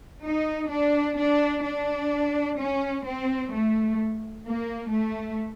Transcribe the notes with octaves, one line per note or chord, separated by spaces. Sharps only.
D#4
D4
D4
D4
C#4
C4
A3
A#3
A3